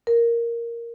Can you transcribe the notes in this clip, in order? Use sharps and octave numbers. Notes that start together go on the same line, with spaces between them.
A#4